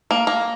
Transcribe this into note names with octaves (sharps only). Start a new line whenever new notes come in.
A#3
A#3